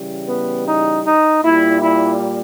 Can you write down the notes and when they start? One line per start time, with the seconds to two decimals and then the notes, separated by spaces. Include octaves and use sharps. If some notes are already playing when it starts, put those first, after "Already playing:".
Already playing: C#3 E3 G3
0.27 B3
0.66 D#4
1.04 D#4
1.42 A#2 G3 E4
1.80 E4